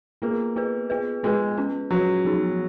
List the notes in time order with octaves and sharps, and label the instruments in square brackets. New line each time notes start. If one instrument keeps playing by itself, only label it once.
[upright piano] A#3 [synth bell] B3 F4 G#4 B4
[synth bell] B3 F4 G#4 B4
B3 F4 G#4 B4
[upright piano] G#3 [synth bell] B3 F4 G#4 B4
[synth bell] C#4 F4 B4
[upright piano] F#3 [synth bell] C#4 F4 B4
[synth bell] F3 B3 D#4 G#4 C#5